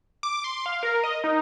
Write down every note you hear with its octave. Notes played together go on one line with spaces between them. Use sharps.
D6
C6
F5
A#4
D#5
D#4